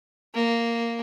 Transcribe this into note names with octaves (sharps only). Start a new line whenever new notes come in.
A#3